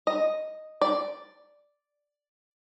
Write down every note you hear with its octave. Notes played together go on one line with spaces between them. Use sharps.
D#5
D5